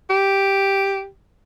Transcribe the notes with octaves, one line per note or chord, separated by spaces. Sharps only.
G4